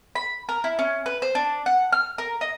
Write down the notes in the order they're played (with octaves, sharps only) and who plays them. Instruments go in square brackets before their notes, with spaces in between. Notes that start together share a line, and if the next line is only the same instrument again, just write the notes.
[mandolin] B5
A#4
E4
C#4
B4
C5
D4
F#5
F6
A#4
D#5